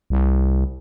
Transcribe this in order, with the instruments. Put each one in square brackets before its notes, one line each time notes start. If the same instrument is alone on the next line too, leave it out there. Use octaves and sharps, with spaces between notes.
[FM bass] C2